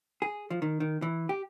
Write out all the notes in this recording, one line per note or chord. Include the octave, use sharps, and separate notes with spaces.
G#4
F3
D#3
D#3
E3
G4